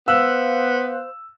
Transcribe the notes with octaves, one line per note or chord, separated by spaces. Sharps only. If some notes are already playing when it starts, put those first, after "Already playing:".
B3 C5 F5 E6 F#6